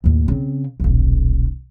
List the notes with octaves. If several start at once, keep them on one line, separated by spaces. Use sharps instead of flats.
A1 D#2
C#3 C4
D#1 B1